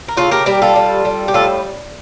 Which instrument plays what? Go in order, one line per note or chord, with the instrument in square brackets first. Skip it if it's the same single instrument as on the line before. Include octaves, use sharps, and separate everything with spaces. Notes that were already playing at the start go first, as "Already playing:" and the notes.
[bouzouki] A#4
C#3 F4 A4
G4 A#4
G3 G4 A#4
F4 A4
G3
G3
G4
A2 F4 A4